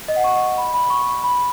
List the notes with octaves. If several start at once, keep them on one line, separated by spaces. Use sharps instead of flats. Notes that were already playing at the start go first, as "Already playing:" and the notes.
D#5
F#5
C#6
B5
B5
C#6
B5